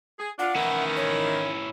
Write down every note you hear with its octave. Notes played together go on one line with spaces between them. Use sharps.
G#4
D4 F4 F#5
D#3 E3 C#4 E4
C#5